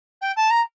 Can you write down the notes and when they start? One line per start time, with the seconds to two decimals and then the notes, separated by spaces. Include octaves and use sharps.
0.21 G5
0.36 A5
0.50 A#5